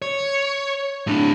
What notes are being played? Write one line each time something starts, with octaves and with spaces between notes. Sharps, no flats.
C#5
A2 D4